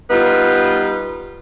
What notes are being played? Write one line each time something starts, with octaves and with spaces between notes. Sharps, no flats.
G3 B3 D#4 F4